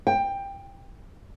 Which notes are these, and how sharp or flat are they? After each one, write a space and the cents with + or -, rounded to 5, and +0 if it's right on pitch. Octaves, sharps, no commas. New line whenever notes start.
G5 +15